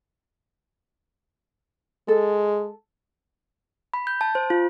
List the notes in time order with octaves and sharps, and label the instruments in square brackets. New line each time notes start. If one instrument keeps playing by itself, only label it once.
[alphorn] G#3 [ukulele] A4
[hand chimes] B5
G6
A5
C5
F4